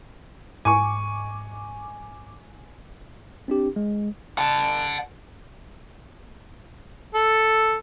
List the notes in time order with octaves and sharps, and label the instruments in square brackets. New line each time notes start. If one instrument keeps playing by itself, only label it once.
[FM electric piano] G#2 D6 [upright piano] G#5 C#6
[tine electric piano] C4 D4 G4
G#3
[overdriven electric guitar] F#5 A5
[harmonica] A4